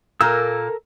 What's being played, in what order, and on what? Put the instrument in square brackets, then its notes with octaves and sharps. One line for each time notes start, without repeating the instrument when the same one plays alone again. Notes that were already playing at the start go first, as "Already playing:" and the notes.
[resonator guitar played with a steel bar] A#2 A#3 [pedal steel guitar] A4 A#4 E6